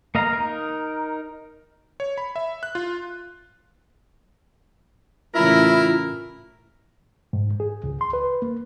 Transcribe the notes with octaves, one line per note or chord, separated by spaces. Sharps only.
A#3 D#5 F5 A#5
D#4 A#4
C#5
B5
E5
F#6
F4
A2 C#3 E3 E4 F4 A#4
G#2
G#4
C#2
C6
B4
A#3